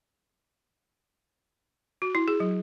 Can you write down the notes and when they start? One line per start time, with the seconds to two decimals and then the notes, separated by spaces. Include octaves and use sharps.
2.02 F#4
2.15 E4
2.28 G#4
2.40 F#3